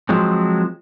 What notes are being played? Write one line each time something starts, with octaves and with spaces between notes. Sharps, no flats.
F3 F#3 G#3 C4